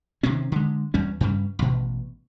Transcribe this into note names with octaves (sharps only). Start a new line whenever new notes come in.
C3 D#3 C4 C#4
D3 G#3
E2 G3 C#4
G2 C#3 G3
A1 B2